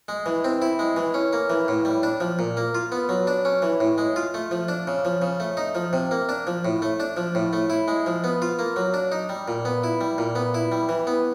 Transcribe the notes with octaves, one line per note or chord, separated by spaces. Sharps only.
G#3
E3
C4
E4
G#3
E3
C#4
A#3
E3
A2
G3
D4
F3
A#2
A#3
F4
B3
F#3
D4
C#4
E3
A2
G#3
F4
A3
F3
D4
C#3
F3
C#3
A3
D#4
F3
C3
A#3
D4
F3
A2
A3
D4
F3
A2
A3
E4
G#3
F3
B3
F4
A#3
F#3
D4
D#4
G3
A#2
B3
E4
G3
A#2
B3
E4
G3
E3
B3